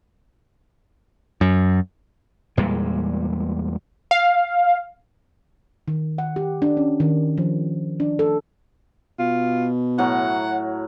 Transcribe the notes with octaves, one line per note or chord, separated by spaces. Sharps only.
F#2
E2 A#2 G3 G#3
F5
D#3
F#5
G4
D4
C#4
D#3
F3
D4
A4
B2 F4
A2 F#3 F#5